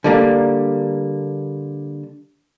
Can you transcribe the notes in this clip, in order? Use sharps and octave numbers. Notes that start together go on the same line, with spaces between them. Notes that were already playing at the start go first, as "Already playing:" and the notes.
D3 G3 A#3